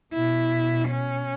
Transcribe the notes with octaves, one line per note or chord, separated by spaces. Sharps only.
B2 E4
C#4